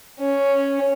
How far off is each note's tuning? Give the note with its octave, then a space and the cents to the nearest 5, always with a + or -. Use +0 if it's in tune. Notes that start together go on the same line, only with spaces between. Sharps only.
C#4 +0